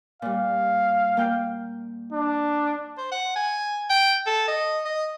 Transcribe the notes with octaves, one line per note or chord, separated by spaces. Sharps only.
A#2 G3 F5
A#3 G5 G6
D4
C5
F#5
G#5
G5
A4
D#5
D#5